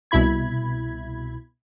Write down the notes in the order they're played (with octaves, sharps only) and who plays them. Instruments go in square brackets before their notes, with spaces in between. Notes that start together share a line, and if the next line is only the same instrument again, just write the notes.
[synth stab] C2 B2 E4 B5 G#6